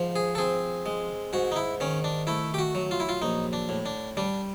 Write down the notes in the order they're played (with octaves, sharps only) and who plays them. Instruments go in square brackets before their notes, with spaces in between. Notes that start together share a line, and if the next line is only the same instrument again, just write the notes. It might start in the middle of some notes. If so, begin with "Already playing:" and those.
Already playing: [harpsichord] G#2 F3
G#4
A4
C4 G#4
G#3
G#2 F#4
D#4
E4
D#3 C#4
D4
A3 E4
G4
F#4
F#3
F4
E4
F4
A#1 D#4
D4
A2
D4
G3 D4